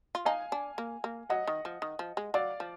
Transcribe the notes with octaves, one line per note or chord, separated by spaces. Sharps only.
F4
D#4 F5 G#5
D4
A#3
A#3
F#3 D#5 F#5
D#3
F3
D#3
F3
G#3
F#3 D5 F5
F3